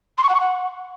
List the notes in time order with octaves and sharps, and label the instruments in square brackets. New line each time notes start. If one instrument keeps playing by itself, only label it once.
[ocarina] C6
C#6
F#5
C#6
F#5